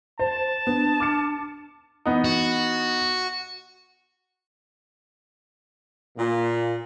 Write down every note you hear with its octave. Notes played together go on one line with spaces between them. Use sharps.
C5 A5
B3 D4
D6 F6 C#7
E3 B3 D#4
F#4
A#2